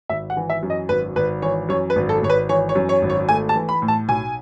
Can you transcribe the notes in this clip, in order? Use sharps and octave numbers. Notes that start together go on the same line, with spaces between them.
G#1 E5
F#5
E3
E5
F#2
D#5
G#1 B4
G#1 B4
E3 C#5
F#2 C#5
B4
G#1
A4
G#1 C#5
B4
E3 C#5
C#5
F#2
C#5
G#1
C#5
A3 G#5
A5
E3
B5
A2
A5
B1 G#5